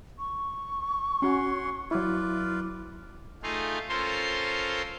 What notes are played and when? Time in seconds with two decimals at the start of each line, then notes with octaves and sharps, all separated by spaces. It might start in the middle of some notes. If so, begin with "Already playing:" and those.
0.19 C#6
1.22 C#4 F#4 C#5 F#5 C6
1.91 F#3 E4 F4 B4 D5
3.43 A3 D#4 F4 G#4 F5
3.89 C#4 F4 A4 A#4 C5 C6